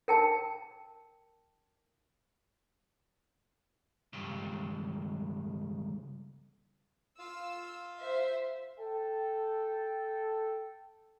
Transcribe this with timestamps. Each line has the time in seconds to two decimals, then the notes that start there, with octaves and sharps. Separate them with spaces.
0.08 A#4 G5 A5
4.13 C#2 G2
7.19 F4 F5 E6
8.00 C5 E5
8.80 A4 G5